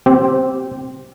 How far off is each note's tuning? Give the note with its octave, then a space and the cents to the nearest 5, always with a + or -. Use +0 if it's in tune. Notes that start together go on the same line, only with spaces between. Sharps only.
C4 +0 G4 -15